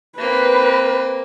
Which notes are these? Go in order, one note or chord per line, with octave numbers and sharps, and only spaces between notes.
A#3 C4 B4